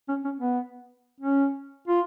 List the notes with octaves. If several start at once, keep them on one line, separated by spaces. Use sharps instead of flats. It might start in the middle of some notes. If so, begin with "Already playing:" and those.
C#4
C#4
B3
C#4
F4